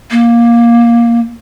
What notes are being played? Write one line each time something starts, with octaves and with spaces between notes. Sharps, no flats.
A#3